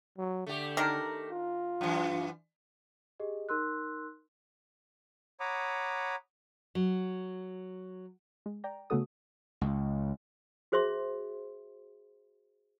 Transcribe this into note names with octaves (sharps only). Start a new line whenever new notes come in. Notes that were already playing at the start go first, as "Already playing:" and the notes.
F#3
D3 A3 G4
D#3 D4 A#4
F4
F#2 E3
G4 G#4 D#5
D#4 A#4 C6 E6 F#6
C#5 F#5 A#5 B5 D6 D#6
F#3
G#3
D5 G5 A#5
C#3 A3 B3 F#4 A4 D#6
C#2
F#4 G#4 C5 E5 C6